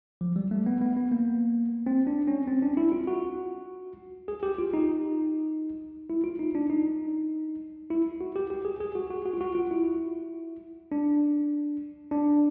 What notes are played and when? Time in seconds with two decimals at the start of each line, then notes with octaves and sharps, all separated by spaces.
0.21 F3
0.36 G3
0.51 A3
0.66 B3
0.81 B3
0.97 B3
1.12 A#3
1.86 C4
2.07 D4
2.28 C#4
2.47 C4
2.62 D4
2.77 E4
2.92 F4
3.07 F#4
4.28 G#4
4.43 G4
4.58 F4
4.74 D#4
6.10 E4
6.24 F4
6.39 D#4
6.55 D4
6.70 D#4
7.90 E4
8.21 F#4
8.36 G4
8.50 G4
8.65 G#4
8.80 G#4
8.95 F#4
9.10 F#4
9.26 F#4
9.33 F4
9.41 F#4
9.55 F4
9.71 E4
10.92 D4
12.11 D4